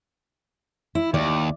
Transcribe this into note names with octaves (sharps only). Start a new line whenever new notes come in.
E4
D#2 D5